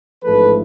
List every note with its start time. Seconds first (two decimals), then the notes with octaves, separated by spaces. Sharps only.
0.24 A1 G#2 F3 A3 A4 B4